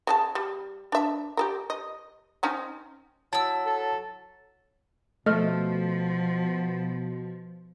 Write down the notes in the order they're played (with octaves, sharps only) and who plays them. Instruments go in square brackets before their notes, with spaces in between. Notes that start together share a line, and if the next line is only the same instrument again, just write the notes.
[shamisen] C#3 F4 A5
G3
D4 E5
G4 A4 A#4
D#5
C4 C#4 D#4
[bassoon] F#3 [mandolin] E4 E6 [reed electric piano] A5
[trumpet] A4
[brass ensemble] B2 [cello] F3 [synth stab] A3 [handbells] D#5 F6